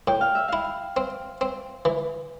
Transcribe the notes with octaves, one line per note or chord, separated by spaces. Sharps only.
A2 G5
F5
E5
E4 F5
C4
C4
E3